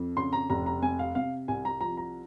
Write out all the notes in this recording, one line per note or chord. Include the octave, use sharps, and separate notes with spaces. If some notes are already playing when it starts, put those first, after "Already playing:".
Already playing: F2
C#3 C6
A#5
F1 A#5
A#5
C3 G#5
F5
C3 F5
C2 G#5
A#5
F3 A#5
A#5